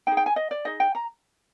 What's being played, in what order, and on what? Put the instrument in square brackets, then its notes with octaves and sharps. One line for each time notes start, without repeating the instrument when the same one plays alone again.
[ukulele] D#4 G#4 G5
G5
G#5
D#5
D5
D#4 G#4 D#5
G5
A#5